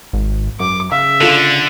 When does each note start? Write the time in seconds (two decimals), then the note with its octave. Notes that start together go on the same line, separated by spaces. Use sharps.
0.13 G#1
0.60 F#2 D6
0.92 C#3 E5 F5
1.21 D3 D4 F4 A4